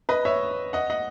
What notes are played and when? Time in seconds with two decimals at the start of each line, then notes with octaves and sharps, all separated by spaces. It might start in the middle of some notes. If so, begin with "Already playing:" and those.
0.09 B4 D#5
0.25 C#5 E5
0.73 D#5 F#5
0.90 D#5 F#5